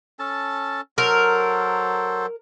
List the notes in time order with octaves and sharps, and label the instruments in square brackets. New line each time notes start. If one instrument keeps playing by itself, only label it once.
[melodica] C#4 A4 A5
[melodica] F#3 A4 C5 [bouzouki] A#4